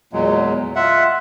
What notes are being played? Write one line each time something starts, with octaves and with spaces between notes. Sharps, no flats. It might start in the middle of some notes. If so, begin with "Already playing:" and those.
E2 A#2 F#3 G#3
F4 E5 F#5